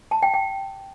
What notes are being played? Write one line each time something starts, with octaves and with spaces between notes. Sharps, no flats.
A5
G5
G5